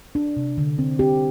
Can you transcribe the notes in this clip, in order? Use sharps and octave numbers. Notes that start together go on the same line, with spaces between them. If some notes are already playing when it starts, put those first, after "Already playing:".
D4
C3
D3
C4
C4 G4